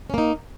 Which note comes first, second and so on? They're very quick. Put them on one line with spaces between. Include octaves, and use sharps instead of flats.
C#4 A#3 D#4